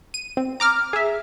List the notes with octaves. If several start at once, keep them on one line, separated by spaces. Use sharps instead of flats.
D#7
C4
A#5 D6 F6
G#4 E5